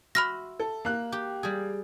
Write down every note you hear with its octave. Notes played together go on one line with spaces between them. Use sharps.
F#4 E5 B5 C6 F6 A#6
A4
A#3 F#6
G4
G3 G#4